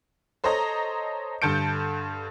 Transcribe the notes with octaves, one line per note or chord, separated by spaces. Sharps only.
A4 C5 C#5 D#5 A#5
G2 D3 A5 G6 C#7 D7